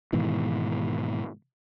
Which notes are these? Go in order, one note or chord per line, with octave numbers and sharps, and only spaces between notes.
G#2 B2 D#3 E3